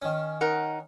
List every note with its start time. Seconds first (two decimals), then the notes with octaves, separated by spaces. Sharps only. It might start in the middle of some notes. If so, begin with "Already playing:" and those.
0.02 D#3 C#4
0.41 D#4 A#4 F#5